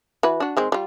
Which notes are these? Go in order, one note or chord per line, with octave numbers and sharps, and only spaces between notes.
E3 F#4 B4
D4 F#4
D#3 G#3 C4
G3 F4